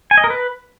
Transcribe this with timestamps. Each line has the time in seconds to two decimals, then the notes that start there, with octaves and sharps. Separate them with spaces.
0.11 G#5
0.18 D#5
0.24 A#4
0.30 B4